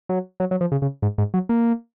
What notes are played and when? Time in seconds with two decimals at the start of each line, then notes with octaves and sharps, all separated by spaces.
0.09 F#3
0.40 F#3
0.51 F#3
0.61 F3
0.72 C#3
0.82 C#3
1.02 G#2
1.18 G#2
1.34 F#3
1.49 A#3